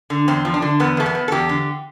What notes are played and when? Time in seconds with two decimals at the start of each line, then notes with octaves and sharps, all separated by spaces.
0.10 D3
0.28 E2 C4
0.45 F3
0.54 D4
0.62 D3
0.80 E2 B3
0.97 E2 A3
1.06 B3
1.15 E2
1.28 A4
1.32 E2 G4
1.49 D3